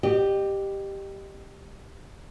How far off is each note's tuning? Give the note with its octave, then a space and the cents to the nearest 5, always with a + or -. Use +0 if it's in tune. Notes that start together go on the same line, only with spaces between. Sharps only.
G4 +0 D#5 -35